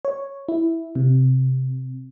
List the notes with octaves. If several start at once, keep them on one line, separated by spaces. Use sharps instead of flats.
C#5
E4
C3